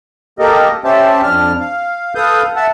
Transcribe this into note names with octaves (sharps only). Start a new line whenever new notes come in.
A#3 G4 A4 A#4 D#5
C#4 G4 C5 E5 A5
F2 D4 F6
F5
A4 B4 F5 D#6 G6
E5 F#5 A5